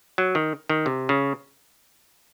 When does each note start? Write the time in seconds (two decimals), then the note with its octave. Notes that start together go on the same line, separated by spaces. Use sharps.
0.18 F#3
0.35 D#3
0.70 D#3
0.86 C3
1.09 C#3